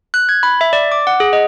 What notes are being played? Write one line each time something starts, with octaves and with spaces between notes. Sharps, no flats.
F#6
G#6
B5
E5
D5
D6
F#5
G#4
D#5